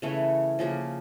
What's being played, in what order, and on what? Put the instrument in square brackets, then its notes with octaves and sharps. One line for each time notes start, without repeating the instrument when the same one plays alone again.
[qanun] C#3 E3 A3 C#4
C#3 F3 A#3